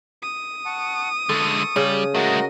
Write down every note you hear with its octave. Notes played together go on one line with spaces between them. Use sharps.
D#6
F#5 A5 C#6
D3 G#3 A4 C#6
C#3 G3
G#3 A3 F#4 A#4 D#5